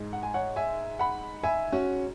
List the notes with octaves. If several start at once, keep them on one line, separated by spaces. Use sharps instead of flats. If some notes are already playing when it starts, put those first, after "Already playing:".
Already playing: G#2 G#3
F#5
G#5
C#5 F#5
E5 G#5
F#5 B5
E5 G#5
C#4 F#4